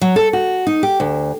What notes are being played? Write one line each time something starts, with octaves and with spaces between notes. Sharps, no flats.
F#3
A4
F#4
D#4
G4
D2